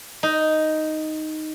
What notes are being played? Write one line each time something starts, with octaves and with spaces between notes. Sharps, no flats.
D#4